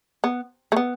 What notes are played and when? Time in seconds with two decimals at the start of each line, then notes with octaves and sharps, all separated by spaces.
0.24 B3
0.72 A3
0.76 B3